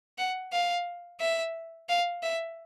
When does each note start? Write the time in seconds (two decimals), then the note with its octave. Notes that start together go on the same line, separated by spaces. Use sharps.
0.18 F#5
0.53 F5
1.20 E5
1.89 F5
2.23 E5